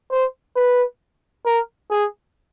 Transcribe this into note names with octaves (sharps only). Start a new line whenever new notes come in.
C5
B4
A#4
G#4